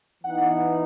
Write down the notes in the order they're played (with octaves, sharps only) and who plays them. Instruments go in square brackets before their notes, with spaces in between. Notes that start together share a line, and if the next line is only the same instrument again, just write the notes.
[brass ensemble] E3 B3 D#4 F#5